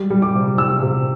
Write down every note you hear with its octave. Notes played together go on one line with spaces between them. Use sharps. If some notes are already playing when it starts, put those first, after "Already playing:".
Already playing: G3
G3
D6
C3
C3 E6
C3